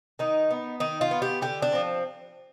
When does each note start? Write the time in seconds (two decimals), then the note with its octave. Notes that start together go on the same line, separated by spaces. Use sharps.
0.19 D#3 D#4
0.51 B3
0.80 D#3 D#4
1.01 F4
1.11 B3
1.22 G4
1.42 D3 G4
1.62 D4
1.72 F3 C4